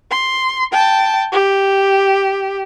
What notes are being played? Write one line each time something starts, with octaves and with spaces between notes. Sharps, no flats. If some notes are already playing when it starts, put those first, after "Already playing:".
C6
G5 A5
G4